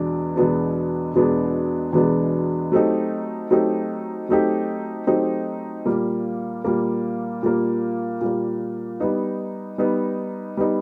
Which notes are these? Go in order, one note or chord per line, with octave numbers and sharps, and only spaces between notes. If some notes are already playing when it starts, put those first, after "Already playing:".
Already playing: E2 B2 G#3 B3 D4
E2 B2 G#3 B3 D4
E2 B2 G#3 B3 D4
E2 B2 G#3 B3 D4
F#3 A3 C4 D#4 G4
F#3 A3 C4 D#4 G4
F#3 A3 C4 D#4 G4
F#3 A3 C4 D#4 G4
A#2 G3 A#3
A#2 G3 A#3
A#2 G3 A#3
A#2 G3 A#3
G3 B3 D#4
G3 B3 D#4
G3 B3 D#4